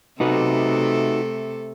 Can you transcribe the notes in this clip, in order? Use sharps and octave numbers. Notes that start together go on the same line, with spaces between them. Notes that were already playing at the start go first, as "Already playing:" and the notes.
C3 A3 D#4 F#4 A4 B4